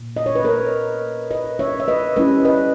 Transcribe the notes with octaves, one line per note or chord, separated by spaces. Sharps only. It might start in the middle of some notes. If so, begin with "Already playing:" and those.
Already playing: A#2
D#5
C#5
B4
A#4 C#5
B4 D#5
C#5 E5
E5
B4 D#5
G3 C#4 E4 B4 D#5
B4 D#5